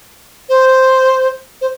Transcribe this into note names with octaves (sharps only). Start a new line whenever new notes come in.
C5
C5